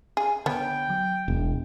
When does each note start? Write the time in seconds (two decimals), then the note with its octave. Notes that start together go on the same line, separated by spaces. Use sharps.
0.17 G#4
0.46 D3 B3 C#5 G5
0.90 F#3
1.28 E1